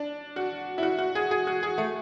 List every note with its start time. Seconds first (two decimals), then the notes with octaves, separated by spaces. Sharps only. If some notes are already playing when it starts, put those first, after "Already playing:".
Already playing: D4
0.36 F#4
0.78 E4
0.83 F#4
0.98 F#4
1.15 G#4
1.31 G#4
1.47 F#4
1.63 G#4
1.78 A3